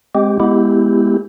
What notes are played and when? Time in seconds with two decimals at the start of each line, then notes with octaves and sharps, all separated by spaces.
0.15 G#3 C4 G4
0.40 G#3 B3 E4 G4